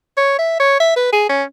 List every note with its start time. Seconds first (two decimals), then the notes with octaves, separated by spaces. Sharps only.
0.17 C#5
0.39 E5
0.60 C#5
0.80 E5
0.97 B4
1.13 G#4
1.29 C#4